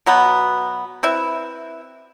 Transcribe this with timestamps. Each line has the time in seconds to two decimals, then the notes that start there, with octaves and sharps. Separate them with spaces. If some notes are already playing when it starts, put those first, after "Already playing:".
0.06 B2 F#3 B3
1.03 C4 E4 B4 E5